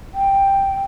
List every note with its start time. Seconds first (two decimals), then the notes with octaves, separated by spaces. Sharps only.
0.14 G5